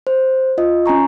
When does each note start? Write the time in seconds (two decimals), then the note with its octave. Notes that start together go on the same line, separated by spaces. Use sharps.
0.07 C5
0.58 F4 D#5
0.86 C#4 G#5 A#5 C#6